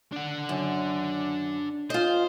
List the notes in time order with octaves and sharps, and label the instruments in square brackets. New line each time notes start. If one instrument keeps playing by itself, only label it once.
[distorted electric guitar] D4 F#5
[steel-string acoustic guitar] F#2
[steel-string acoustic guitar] F4 D#5 [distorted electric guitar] C5